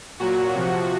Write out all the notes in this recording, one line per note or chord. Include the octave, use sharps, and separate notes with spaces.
A#2 F#3 F#4
C3 F3